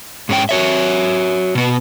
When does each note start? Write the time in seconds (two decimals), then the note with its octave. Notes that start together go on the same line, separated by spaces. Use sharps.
0.29 G#2 C#4 G5
0.49 F#4 C#5 E5
1.55 B2 B3